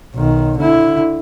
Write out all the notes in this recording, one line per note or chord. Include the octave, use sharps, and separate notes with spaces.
B1 D#3
D3 E4